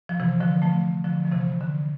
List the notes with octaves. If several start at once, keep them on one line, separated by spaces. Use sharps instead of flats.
F3
C3 E3
D3 F3
F3 A3
D3 F3
F3
C3 E3
D3